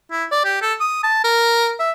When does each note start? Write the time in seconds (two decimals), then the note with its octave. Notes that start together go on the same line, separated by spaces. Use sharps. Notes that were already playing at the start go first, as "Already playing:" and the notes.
0.11 E4
0.32 D5
0.45 G4
0.62 A4
0.81 D#6
1.03 A5
1.24 A#4
1.80 E5